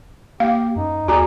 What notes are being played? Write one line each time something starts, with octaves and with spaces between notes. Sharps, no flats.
A#3 G4 F5
F#2 D#4
D#2 F#4 G#4 D5 A#5